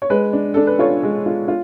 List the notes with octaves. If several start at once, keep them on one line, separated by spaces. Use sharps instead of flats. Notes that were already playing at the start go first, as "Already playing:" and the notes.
C#5
G#3 B4
D4
D4 A4
B4
F4 A4 C#5
G#3
F4
F4